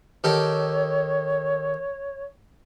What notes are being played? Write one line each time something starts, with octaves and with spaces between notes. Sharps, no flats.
D#3 G4 A4 C#5